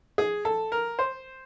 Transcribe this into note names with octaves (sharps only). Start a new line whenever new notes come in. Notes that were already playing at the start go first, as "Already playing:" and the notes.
G#4
A4
A#4
C5